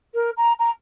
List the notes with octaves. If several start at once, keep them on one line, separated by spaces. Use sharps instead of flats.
A#4
A#5
A#5